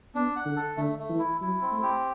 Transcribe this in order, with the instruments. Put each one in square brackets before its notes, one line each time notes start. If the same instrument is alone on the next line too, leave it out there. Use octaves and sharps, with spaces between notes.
[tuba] B3 [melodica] D4
[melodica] F#5
[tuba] D3
[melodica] A4
[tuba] D3 [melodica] A3
[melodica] A3
[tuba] E3
[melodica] E4
[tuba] F#3 [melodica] E4
[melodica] C4
[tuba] A3
[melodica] G4